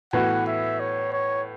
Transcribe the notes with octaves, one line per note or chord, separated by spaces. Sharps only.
A2 E3 B3 F#4 F#5
E5
C#5
C#5